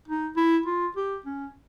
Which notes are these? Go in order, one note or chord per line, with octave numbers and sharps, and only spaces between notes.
D#4
E4
F4
G4
C#4